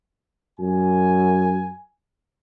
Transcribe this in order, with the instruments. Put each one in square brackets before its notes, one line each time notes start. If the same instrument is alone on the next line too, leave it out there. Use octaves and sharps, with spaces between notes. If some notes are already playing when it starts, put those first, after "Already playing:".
[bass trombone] F#2 [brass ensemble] G#5